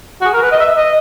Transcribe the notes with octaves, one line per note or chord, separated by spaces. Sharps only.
F#4
G#4
A#4
B4
D#5
E5
D#5